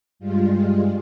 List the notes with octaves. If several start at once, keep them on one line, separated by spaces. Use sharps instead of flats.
G2 G3 G#3 F4